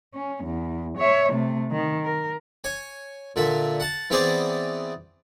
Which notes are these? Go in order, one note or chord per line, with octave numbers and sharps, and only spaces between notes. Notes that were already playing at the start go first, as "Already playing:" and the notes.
C#4
E2
C#5 E5
C3 A3
D#3
A#4
C#5 G#5
A#2 D3 E5
F#5 A5
E3 B3 C4 G#4 C5 D5